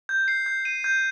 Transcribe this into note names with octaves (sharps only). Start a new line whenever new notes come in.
G6
C7
G6
D#7
G6